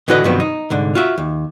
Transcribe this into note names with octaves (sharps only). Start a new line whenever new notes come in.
A2 D3 E3 F#4 B4 D#5
G2 C3 D#3 F3 F#3 B3
D#4
C2 G#2 D3
F4 F#4 E5
D#2